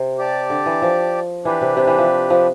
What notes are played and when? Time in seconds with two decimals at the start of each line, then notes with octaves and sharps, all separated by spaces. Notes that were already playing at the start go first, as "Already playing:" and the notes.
Already playing: C3
0.18 G4 D5 A5
0.50 D3
0.66 E3
0.82 F3
1.45 E3 D4 G4 B4
1.61 C3
1.77 C3
1.87 E3
1.98 F3
2.30 F3